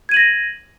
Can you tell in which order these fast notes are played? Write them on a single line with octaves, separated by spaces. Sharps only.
G#6 D#7 F#7 A#6